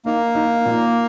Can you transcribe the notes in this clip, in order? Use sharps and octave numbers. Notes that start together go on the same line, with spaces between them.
A#3 D#4
D#4
A#2